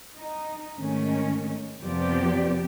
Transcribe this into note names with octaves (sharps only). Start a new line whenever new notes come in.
D#4
G#2 D#3 A3 C#4
F2 C3 F3 B3 G4 D5